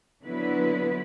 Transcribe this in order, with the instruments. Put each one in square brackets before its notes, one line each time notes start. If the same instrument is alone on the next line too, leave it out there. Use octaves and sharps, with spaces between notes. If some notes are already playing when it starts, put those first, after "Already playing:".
[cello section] D3 F#3 B3 E4 B4